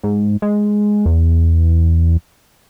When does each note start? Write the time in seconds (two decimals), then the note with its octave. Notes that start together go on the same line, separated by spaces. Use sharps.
0.03 G#2
0.42 G#3
1.06 E2